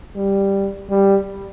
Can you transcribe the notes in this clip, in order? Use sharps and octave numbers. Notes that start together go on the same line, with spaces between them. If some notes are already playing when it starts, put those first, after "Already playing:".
G3
G3